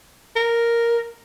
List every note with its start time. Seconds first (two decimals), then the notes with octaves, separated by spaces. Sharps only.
0.36 A#4